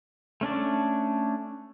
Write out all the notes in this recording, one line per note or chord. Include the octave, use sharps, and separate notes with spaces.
A3 C#4 D4 D5